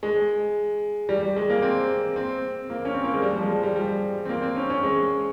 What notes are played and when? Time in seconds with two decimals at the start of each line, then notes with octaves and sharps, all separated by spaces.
0.03 G#3
1.09 G3
1.23 G3
1.36 G#3
1.50 A#3
1.62 C4
2.16 C4
2.70 A#3
2.85 C#4
2.94 C4
3.04 A#3
3.14 G#3
3.22 G3
3.36 F3
3.43 G#3
3.49 G3
3.63 G3
3.76 G3
4.25 C4
4.29 A#3
4.42 C4
4.56 C#4
4.70 C#4
4.83 G#3